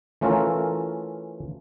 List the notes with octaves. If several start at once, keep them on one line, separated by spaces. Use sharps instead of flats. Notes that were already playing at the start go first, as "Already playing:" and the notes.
E3 A3 C#4 F4 A4 A#4